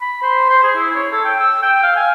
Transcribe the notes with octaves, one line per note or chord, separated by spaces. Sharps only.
B5
C5
C5
G#4
E4
C#5
A4
G5
E6
G5
F5
G#5